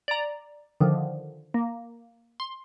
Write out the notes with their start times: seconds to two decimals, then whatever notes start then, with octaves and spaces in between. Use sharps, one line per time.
0.08 D5 A#5
0.80 D3 D#3 F3
1.54 A#3
2.40 C6